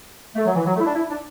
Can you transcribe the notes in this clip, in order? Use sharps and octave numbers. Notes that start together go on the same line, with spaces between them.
A3
F#3
E3
F#3
A3
E4
D4
E4
D4